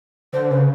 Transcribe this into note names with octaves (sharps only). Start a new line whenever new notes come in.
D3 C5
C#3 B4